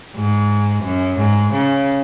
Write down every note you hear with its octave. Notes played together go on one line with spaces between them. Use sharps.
G#2
F#2
G#2
C#3